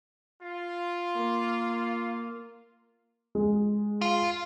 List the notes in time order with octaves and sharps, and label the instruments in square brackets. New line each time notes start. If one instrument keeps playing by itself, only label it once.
[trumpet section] F4
[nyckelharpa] A#3
[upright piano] G#3
[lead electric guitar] F4